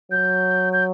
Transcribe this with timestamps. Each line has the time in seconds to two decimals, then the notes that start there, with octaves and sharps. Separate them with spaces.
0.11 F#3 G6
0.73 G6